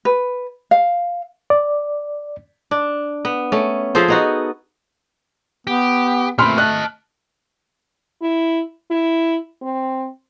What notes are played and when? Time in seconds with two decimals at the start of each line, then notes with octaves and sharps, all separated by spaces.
0.05 B4
0.71 F5
1.50 D5
2.71 D4
3.25 B3
3.52 A3 C#4
3.95 F3 G#4 A4 C5
4.08 B3 D#4 F#4
5.67 B3 G4
6.39 A#2 A3 C4 B5 C6 F6
6.58 D#5 A5 F#6
8.21 E4
8.90 E4
9.62 C4